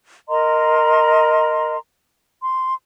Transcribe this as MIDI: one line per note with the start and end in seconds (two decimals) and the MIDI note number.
0.28 1.77 70
0.28 1.77 75
0.28 1.77 82
0.28 1.77 84
2.42 2.74 84